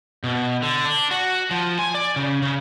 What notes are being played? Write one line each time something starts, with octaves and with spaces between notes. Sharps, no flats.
B2
D3
D4
F#4
F3
G#5
D5
C#3
C#3